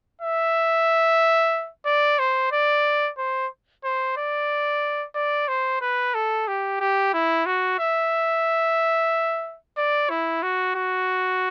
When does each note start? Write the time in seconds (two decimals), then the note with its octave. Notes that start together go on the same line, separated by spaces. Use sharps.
0.21 E5
1.86 D5
2.19 C5
2.52 D5
3.18 C5
3.84 C5
4.17 D5
5.15 D5
5.48 C5
5.81 B4
6.14 A4
6.47 G4
6.80 G4
7.14 E4
7.46 F#4
7.79 E5
9.77 D5
10.10 E4
10.43 F#4
10.75 F#4